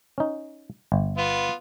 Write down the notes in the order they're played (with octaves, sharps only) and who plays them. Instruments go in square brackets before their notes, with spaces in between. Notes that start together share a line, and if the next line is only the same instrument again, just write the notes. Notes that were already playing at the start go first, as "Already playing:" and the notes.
[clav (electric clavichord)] C#4 D#4
G1
[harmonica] B3 F4